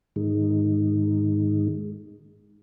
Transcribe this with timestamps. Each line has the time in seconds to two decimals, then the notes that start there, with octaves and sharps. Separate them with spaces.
0.16 G#2 D#3 G#3